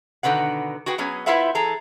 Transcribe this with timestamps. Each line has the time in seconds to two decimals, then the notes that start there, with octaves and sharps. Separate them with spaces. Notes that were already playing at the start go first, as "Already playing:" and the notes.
0.23 B2 D3 D#3 B4 F#5
0.86 F#4 G#4 B4 G5
0.98 F#3 B3 C#4 G#4
1.26 E4 F4 B4 C5 E5 F#5
1.55 E3 G#4 A4 A#5